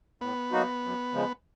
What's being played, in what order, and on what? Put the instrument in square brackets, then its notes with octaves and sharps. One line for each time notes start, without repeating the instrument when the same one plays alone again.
[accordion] A2 [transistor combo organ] B3
[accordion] F#3 A#3 D#4 F#4
F#2
C#3 F3 G#3